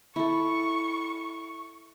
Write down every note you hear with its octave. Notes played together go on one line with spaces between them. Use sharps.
E4 A4 C#6